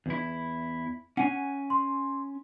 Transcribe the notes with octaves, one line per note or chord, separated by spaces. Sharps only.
E2 E4
C#4 F#5 G#5
C6